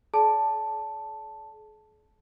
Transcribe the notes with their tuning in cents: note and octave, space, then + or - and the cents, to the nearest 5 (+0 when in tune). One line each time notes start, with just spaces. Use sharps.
G#4 +45 D5 -30 A5 +0